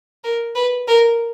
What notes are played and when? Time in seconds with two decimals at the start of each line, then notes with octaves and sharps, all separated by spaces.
0.24 A#4
0.55 B4
0.87 A#4